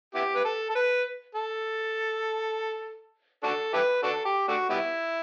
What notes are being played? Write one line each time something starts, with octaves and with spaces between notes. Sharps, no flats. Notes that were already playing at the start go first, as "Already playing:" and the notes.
B3 E4 G4
B4
A4
A4
B4
A4
D4 F#4 A4
E4 G4 B4
D4 F#4 A4
G4
A3 D4 F#4
G3 B3 E4